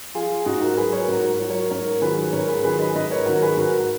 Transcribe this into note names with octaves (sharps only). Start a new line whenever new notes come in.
F3 F4 G#4
G#2 D#4 F#4
F#4 A#4
F#3 G#4 B4
A#4 C#5
G#2 F#4 A#4
F#3
A#4 C#5
G#2 A#4 C#5
D#3 F#3 G#4 B4
G#2 A#4 C#5
G#4 B4
D#3 F#3 G#4 B4
B4 D#5
G#2 B4 D#5
A#4 C#5
D#3 F#3 F#4 A#4
G#4 B4
G#2 F#4 A#4
A#4